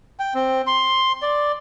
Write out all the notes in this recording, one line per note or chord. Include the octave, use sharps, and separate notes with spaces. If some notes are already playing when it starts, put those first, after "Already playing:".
G5
C4
C6
D5